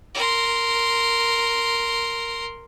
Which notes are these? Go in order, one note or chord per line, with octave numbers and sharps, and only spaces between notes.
A#4 C6